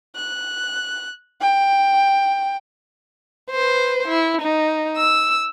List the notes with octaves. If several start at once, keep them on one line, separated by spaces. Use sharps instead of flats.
F#6
G5
B4 C5
E4
D#4
E6